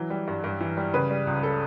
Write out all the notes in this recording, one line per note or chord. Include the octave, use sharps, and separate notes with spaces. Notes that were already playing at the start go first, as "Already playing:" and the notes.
Already playing: E3 F#3
G3
G2
G2
E3
G3
C#3 B4
G3
C#2
A4